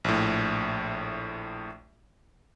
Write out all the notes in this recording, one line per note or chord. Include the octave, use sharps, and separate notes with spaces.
A#1 A2